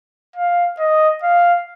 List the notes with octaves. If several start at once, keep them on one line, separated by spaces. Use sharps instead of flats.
F5
D#5
F5